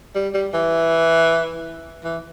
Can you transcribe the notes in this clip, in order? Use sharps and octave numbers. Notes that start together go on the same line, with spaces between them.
G3
G3
E3
E3